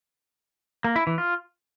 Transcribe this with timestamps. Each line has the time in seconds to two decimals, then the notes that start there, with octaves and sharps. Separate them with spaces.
0.84 A#3
0.96 E4
1.07 E3
1.18 F4